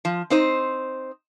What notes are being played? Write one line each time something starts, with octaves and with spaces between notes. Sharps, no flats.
F3
C4 D#4 C5